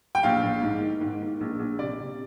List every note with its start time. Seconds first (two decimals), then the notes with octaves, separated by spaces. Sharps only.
0.15 G5
0.23 A#1 F5
0.43 A#1
0.62 G#2
0.82 D#3
1.01 G#2
1.22 D#3
1.41 A#1
1.59 A#1
1.79 C3 D5
2.00 C3